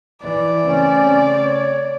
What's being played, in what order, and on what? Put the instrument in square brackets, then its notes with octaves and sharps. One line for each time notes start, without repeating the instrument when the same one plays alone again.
[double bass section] E3 [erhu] D5
[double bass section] C#3 A3 C4 [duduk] C#4
[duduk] C#5